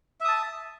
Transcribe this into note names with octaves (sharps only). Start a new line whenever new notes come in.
E5 A5 D#6